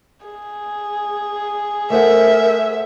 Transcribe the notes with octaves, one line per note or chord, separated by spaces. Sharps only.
G#4
A3 A#4 C5 E5 F#5